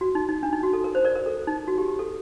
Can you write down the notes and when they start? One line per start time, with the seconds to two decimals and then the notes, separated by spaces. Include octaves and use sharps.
0.01 F#4
0.15 D#4
0.29 D#4
0.43 D4
0.53 D#4
0.63 F#4
0.73 A4
0.84 A#4
0.95 C5
1.05 A#4 D5
1.16 A#4
1.26 A4
1.47 D#4
1.68 F#4
1.78 G4
1.88 G4
1.99 A4